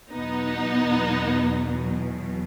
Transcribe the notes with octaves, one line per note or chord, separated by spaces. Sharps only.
E2 B2 F#3 B3 D#4